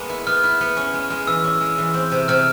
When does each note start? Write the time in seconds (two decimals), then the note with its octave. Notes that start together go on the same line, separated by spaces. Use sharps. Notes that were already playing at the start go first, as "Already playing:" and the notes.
Already playing: G#3 A#3 B3
0.09 E4
0.27 B3 F6
0.43 E4
0.61 B3
0.77 C#4
0.94 G#3
1.10 G#3
1.27 E3 E6
1.44 C#4
1.61 G#3
1.78 E3
1.94 C4
2.12 C3
2.28 C3 F6